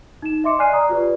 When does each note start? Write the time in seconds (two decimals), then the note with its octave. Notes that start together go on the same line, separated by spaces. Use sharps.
0.22 D#4 E7
0.44 D#5 E5 C6 D6 C#7
0.59 D5 G#5 F6 F#6 C7 D#7
0.73 D5 A#5 D#6
0.89 F4 G4 B4 D5